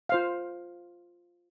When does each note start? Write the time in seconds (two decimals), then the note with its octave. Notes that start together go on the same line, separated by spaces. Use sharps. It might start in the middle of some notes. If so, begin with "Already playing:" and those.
0.09 F4 C5 F5